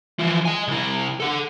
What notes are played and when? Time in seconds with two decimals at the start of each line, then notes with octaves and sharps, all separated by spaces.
0.19 E3 F3
0.45 D#5 G#5
0.68 C2 E4
1.20 A4 F#5